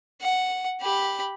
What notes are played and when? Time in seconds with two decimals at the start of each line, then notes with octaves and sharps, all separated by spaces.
0.21 F#5
0.81 G4 B5